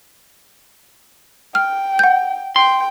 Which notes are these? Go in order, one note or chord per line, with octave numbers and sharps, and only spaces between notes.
G5 F6
F#5 G6
G5 C6